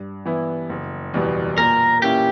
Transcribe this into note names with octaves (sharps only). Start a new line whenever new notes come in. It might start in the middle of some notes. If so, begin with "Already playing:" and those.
Already playing: G2
E3 B3 E4
F#1
E2 B2 G3 B3
A#2 A#4
A#3 C#4 E4 G4